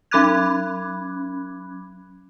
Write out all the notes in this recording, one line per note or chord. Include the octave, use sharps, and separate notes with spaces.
F#3 C#4 B5 D6 F#6 G#6